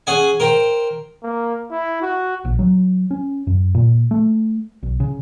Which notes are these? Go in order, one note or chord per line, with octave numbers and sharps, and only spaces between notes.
C#4 G#4 F#5 G#5
A#4 C5 G5
A#3
E4
F#4
A#1
F#3
C#4
F#2
A#2
A3
B1
C#3